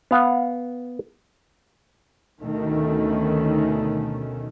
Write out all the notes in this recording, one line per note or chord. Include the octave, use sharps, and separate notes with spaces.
B3 F5 F#5
D2 B2 D#3 A3 C#4